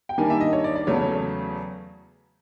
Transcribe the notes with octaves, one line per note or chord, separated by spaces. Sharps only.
G5
D#3 G3 A#3 D4 G#5
E5
D#5
C#5
D5
D5
E2 C#3 F#3 A3 C#5